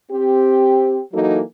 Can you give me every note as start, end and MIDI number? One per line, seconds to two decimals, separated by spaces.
0.12 1.00 60
0.12 1.00 67
1.12 1.41 52
1.12 1.41 54
1.12 1.41 58
1.12 1.41 63
1.12 1.41 66
1.12 1.41 69